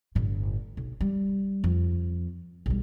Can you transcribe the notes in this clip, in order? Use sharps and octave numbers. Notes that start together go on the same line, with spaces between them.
G1 A2
B1
G3
F2
B1 G3